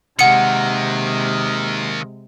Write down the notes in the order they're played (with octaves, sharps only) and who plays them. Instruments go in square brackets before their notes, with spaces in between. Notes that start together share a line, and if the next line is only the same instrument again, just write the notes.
[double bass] C3 G#3 [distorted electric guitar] D#3 A#3 [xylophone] F#5 C#7